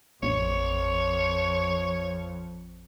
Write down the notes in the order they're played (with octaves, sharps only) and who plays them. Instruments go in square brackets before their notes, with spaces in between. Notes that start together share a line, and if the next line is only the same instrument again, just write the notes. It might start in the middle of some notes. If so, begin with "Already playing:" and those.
[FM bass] A1 [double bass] F2 [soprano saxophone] C#5